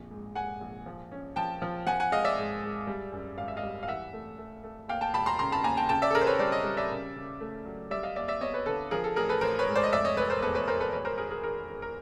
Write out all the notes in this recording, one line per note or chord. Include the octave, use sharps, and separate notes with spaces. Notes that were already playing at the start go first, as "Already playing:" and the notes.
Already playing: A#1 F2
G#2
G#2 F#5 G#5
A#1
F3
C#4
F3 G5 A5
F3
F3 F#5 G#5
F#5 G#5
G#3 D#5 F5
D5 E5
G#2
G#3
G3
F#2
G#1 F5
E5
D#5 F5
G3
F5
E3 E5 F#5
A3
A3
A3
D#2 F5 G5
G5 A5
E1 A5 B5
A#5 C6
C#3 A#5 C6
A5 B5
D#2 G#5 A#5
G5 A5
C#3 G5 A5
D5 E5
A4
C#3 G#4 A#4
C5
B4 C#5
G3 C5 D5
C#5 D#5
G3
D5 E5
C#3
C#3
A3
F#3
G3 D5 E5
D#5 F5
D#2 D5 E5
D5 E5
B3 C#5 D#5
B4 C#5
D3 A4 B4
F3 G#4 A#4
A4
A1 G#4 A#4
A4 B4
A1 A#4 C5
B4 C#5
G#2
C5 D5
D#5
F1 D5 E5
C#5 D#5
F1 B4 C#5
A#4 C5
E2 A4 B4
B4 C#5
E2 A#4 C5
A4 B4
E1 B4 C#5
A#4 C5
D#3 G#4 A#4
G#4 A#4
D#3 G#4 A#4
D#3
A#4